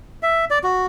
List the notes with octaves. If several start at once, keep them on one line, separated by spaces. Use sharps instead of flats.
E5
D5
F#4